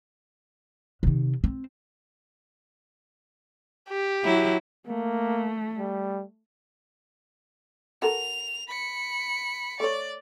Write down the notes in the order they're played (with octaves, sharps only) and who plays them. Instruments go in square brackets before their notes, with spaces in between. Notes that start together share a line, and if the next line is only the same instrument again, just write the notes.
[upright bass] C3 D#3
C4
[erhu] G4
[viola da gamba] F#3 E4
[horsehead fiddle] A3 [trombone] A#3
[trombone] G3
[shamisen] F#4 A4 A#4 [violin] F7
[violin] B5 C#7
[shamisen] A3 C#5 [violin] D5